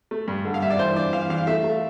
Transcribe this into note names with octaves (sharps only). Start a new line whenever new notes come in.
A3
G2
D3
F5
G2 E5
D5
E3 C5
D4 D5
E3 F5
E3 F5
A3 E5
A3